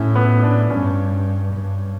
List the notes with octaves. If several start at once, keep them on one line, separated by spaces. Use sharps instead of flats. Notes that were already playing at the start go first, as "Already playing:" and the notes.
Already playing: A2 C#4 E4
B3
D4
G2 C#4
G2